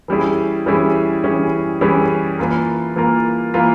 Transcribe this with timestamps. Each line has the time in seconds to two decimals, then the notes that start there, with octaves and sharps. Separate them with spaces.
0.08 E3 G3 C#4 E4 G#4
0.66 E3 G3 C#4 E4 G#4
1.24 E3 G3 C#4 E4 G#4
1.81 E3 G3 C#4 E4 G#4
2.39 E3 A#3 F4 A#4
2.96 E3 A#3 F4 A#4
3.54 E3 A#3 F4 A#4